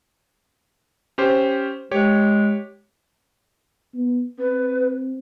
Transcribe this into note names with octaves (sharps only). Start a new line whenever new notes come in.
C#4 G4 C5
G#3 G4 C#5
B3
C4 B4